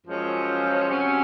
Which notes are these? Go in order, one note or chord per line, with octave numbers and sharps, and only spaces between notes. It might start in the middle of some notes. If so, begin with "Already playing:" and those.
F#2 F3 G#3 C#4 F4
C3 F#3 C#4